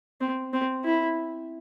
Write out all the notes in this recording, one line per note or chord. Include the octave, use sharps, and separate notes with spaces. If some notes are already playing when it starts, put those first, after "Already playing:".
C4
C4
E4